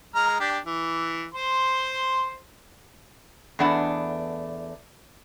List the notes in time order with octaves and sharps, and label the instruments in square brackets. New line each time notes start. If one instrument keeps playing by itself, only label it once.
[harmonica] G#3 A#5 F6
D4 G4
E3
C5 C6
[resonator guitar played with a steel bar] E2 A3 B3 D4 F#5 A5